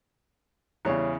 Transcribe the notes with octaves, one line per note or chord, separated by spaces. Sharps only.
E2 C#3 G3 C#5